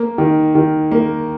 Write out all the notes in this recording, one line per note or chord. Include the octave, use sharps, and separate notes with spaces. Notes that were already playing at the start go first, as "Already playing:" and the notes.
Already playing: A#3
D#3
D#3
A#3